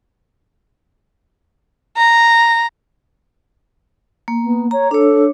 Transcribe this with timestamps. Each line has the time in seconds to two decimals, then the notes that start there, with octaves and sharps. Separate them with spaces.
1.97 A#5
4.28 A#3
4.42 B3
4.71 C#5 A#5
4.91 D4 A4 C#5